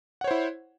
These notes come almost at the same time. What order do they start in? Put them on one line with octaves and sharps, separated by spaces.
F#5 C#5 C5 E4